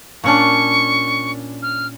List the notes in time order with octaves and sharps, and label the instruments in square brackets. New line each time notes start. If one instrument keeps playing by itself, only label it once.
[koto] A#2 C#4 D4 [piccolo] C#6
[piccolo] F6